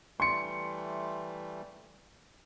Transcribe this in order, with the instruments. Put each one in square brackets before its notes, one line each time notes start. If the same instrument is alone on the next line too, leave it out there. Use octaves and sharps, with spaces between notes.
[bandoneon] E3 G3 A3 [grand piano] C6 C#7